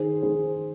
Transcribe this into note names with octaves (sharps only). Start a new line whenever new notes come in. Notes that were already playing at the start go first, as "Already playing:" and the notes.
Already playing: D#3 G#4 C5
D#3 G#4 C5